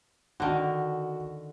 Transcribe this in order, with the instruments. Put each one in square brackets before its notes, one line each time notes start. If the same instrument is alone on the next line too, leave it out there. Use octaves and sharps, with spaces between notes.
[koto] D3 D#3 [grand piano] F#4